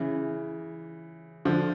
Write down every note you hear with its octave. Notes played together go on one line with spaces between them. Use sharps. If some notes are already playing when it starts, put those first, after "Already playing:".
Already playing: C#3 E3
D3 F3